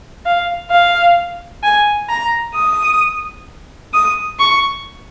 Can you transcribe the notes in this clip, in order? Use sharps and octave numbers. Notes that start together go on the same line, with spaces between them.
F5
F5
G#5
A#5
D#6
D#6
C#6